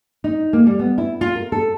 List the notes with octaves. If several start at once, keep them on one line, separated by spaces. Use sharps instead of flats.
D#4
A#3
G3
B3
E4
F4
A#4
A4